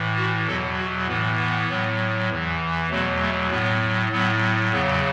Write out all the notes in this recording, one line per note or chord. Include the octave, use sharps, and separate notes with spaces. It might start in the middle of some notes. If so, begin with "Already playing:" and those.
Already playing: A2 E3
F#4
E2 B2 F#3 A4
F#4
A2 E3 B3
B3
A2 F#3
E2 E3
E2 B2 F#3 A3
A3
A2 F#3 B3
A2 F#3 B3
E2 C#3 F#3 B3